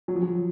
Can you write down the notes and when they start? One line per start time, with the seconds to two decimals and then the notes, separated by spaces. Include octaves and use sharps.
0.08 F#3
0.15 F3
0.23 F#3